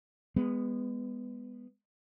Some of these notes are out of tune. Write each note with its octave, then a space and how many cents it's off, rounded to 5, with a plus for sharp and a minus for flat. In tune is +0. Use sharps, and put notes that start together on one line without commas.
G#3 -25 B3 +0